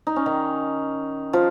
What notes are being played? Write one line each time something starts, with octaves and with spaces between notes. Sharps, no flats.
D#4
C#4
D#3 D#4
F3 F4